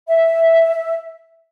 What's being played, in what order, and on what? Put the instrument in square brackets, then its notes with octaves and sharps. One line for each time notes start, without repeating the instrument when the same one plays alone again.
[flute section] E5